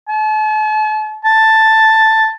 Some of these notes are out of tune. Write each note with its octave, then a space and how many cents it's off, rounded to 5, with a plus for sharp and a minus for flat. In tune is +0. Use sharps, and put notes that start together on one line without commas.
A5 -40
A5 +5